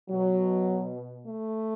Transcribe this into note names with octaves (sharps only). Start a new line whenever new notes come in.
B2 F#3
A3